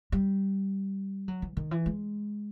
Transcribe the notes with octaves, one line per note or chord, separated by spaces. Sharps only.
G3
F#3
E3
D#3
E3
G#3